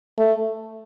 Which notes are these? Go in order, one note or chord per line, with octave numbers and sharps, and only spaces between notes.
A3